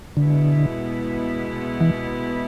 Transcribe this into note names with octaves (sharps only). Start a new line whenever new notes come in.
B2 D3 G#3 B3 E4
E3